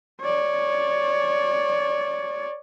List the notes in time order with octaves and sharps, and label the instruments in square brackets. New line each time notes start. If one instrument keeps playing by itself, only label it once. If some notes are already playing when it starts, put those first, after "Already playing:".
[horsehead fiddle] C#5 D5